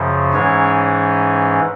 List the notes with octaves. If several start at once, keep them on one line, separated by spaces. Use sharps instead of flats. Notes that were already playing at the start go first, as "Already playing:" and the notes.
Already playing: F#2 C#3 F3
G#2 E3 G#3 C#4 C#5